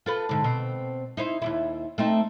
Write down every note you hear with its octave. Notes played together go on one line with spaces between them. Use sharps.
F4 A4 B4
G#2 D3
B2 C4
D#4 E4 C5
D#2 A#2 E4
A3 C4 D#4